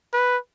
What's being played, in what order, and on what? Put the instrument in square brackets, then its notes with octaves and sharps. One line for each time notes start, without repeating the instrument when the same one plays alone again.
[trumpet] B4